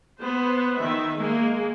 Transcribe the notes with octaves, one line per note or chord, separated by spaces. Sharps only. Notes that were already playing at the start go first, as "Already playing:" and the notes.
B3 C5
D#3 E5
G#3 A#3 G#4